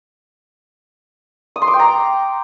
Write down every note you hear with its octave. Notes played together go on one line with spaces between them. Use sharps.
D#6
C6
D6
G5
A#5